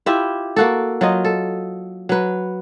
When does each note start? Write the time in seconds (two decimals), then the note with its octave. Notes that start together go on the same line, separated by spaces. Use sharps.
0.06 E4 F4 G4 E5
0.56 A#3 F#4 A4
1.01 F#3 F4 D#5
1.25 A4
2.09 F#3 B4